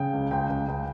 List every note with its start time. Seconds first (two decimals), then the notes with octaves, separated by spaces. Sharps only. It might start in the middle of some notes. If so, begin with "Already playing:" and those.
Already playing: C#3 G5
0.13 C#2
0.31 C#2 G5
0.49 C#2
0.68 C#2